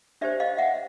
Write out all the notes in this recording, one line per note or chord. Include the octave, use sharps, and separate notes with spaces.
D4 G4 C5 D5 E5
D#5 F5
E5 F#5